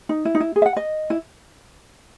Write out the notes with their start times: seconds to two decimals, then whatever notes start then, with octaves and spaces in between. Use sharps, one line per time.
0.09 D#4
0.25 E4
0.35 D#4
0.40 E4
0.56 G#4
0.62 E5
0.66 F#5
0.77 D#5
1.10 E4